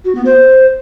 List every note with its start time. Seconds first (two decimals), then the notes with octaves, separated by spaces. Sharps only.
0.05 F#4
0.15 B3
0.25 C5